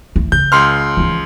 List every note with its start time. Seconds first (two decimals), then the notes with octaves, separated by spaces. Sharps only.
0.16 E3
0.32 C#3 G6
0.52 C#2 C6 F6
0.97 E3 F3